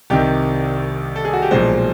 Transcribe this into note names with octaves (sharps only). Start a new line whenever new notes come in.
C2 C3 D#3 G4
A4
G#4
F#4
G4
B1 A#2 F3 G#3 C5